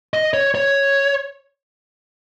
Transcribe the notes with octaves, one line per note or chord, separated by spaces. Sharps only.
D#5
C#5
C#5